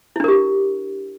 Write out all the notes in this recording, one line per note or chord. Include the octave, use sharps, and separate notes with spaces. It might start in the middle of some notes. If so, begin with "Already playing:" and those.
D4 E4 G4 A#4